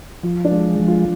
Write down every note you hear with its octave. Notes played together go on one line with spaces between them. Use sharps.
F3 F4
D4
G#3
F3
F4